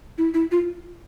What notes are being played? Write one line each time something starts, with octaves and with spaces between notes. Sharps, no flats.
E4
E4
F4